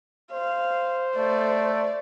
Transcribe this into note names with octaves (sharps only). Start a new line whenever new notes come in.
C5 F5
A3 D5